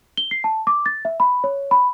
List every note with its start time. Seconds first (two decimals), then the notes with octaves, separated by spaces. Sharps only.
0.17 G7
0.31 C7
0.44 A5
0.67 D6
0.86 A6
1.05 E5
1.20 B5
1.44 C#5
1.71 B5